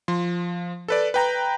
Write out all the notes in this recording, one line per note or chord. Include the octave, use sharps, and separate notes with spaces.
F3 C6
A4 B4 D5
B4 G5 A#5